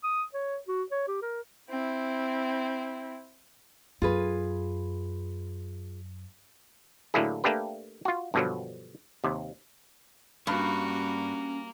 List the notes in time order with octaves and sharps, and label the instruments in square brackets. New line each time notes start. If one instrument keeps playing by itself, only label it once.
[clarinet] D#6
C#5
F#4
C#5
G4
A#4
[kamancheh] C4 E4
[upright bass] F#2 [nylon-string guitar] F4 G#4 B4
[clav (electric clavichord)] A2 D3 F#3 A#3 E4 G#4
A3 A#3 D4 G4 B4
F4 F#4
G2 B2 D3 F3 F#3
D#2 C3
[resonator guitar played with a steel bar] G2 [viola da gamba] G3 F#4 [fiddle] A#3 [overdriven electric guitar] C#4 A#5